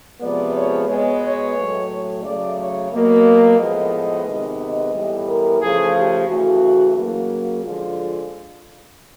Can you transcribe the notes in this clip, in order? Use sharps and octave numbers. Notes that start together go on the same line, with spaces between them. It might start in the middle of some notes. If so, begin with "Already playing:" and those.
C3 F3 G#3 B3 D5
C#5
B2 G#3 B3 C#5
C#5
A2 F#3 A3
C#5
C#3 F#3 A3 D5
C#5
B2 F#3 A#3
A2 F3 G#3 B3 D#5
C3 D#3 G#3 B3
D#5
A2 E3 G3 B3
A#4
C#3 F3 A3 G#4
G4
C#3 E3 A3 F#4
C#3 F#3 A#3 F#4
D3 F3 G#3 F4